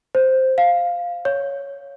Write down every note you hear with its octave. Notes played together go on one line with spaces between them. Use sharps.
C5
F5
C#5